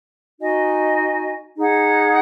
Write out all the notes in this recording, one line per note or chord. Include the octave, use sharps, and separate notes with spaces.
D#4 F#4 D#5 G#5
D#4 G#4 F#5